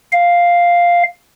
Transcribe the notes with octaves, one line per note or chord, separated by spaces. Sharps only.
F5